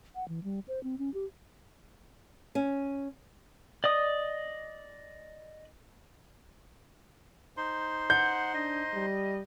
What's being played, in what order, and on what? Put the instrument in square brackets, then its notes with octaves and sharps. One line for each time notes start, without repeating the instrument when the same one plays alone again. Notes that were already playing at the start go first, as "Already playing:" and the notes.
[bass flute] F#5
E3
G3
C5
C4
C#4
G4
[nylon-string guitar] C#4
[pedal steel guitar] D5 D#5 D#6
[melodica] D#4 C5 C6
[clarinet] F#5 [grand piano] G6
[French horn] D4 [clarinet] D#5
[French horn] G3